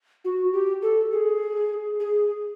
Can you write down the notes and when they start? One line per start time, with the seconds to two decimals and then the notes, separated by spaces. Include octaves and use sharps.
0.25 F#4
0.53 G4
0.82 A4
1.12 G#4
2.00 G#4